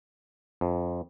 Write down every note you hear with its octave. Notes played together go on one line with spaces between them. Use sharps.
F2